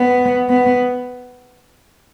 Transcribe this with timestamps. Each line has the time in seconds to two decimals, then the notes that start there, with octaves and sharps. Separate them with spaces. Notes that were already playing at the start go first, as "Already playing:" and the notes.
Already playing: B3
0.50 B3